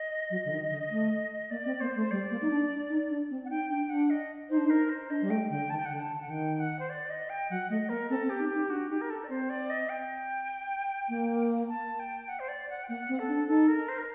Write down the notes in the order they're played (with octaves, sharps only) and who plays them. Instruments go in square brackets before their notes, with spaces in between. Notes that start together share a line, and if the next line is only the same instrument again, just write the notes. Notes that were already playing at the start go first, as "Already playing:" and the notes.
Already playing: [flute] D#5
[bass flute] F#3
D3
D#3
D3
A3
[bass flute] A#3 [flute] D5
[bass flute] C4
[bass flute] A#3 [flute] C5
[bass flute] A3
[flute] C5
[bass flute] G3 [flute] D5
[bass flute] A#3
D#4
D4
D4
D#4
D4
C4
[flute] F#5
[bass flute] D#4 [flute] G5
[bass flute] D4 [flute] G5
[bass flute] D4 [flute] F#5
[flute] D#5
[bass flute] D#4 [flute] C5
[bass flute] D4
D#4
[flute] A#4
C5
[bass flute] D4 [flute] D#5
[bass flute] G3
[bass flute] A3 [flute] G5
[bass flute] D3 [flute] G5
[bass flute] D#3 [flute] A5
[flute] G5
F#5
[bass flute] D3
[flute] G5
A5
[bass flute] D3
[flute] F#5
[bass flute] D3
[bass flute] D#3 [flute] G5
[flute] F#5
C5
D5
D#5
G5
[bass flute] F#3 [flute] F#5
[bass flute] A3 [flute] D#5
[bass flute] A#3 [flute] A#4
[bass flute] C4 [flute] A4
[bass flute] C4
[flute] G4
[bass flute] D#4
[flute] G4
[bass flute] D#4
[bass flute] D4 [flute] F#4
[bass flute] D#4 [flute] G4
[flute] A#4
A4
D5
[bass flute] C4 [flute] C5
[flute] D5
D#5
G5
[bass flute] A#3
[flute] A5
G5
F#5
C5
D5
F#5
G5
[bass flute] A#3 [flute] F#5
[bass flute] C4
[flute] A4
[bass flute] D4
[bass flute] D#4 [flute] A4
[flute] A#4
C5
A#4